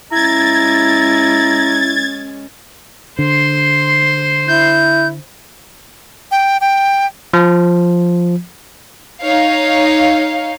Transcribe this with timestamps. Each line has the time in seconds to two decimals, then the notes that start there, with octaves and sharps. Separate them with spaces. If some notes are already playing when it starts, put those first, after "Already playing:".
0.12 G#3 C#4 E4 A#5 G#6 A6
3.19 D3 C5 C6
4.48 E4 G6
6.31 G5
6.61 G5
7.34 F3
9.21 D#4 C#5 F5